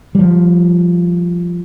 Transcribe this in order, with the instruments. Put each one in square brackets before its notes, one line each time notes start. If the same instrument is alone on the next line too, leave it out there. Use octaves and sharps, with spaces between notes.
[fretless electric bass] F3 G3